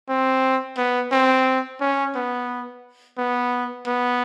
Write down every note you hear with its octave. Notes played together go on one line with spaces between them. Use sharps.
C4
B3
C4
C#4
B3
B3
B3